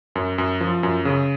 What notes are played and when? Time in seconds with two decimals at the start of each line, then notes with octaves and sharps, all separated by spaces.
0.15 F#2
0.38 F#2
0.61 F3
0.83 F#2
1.05 C#3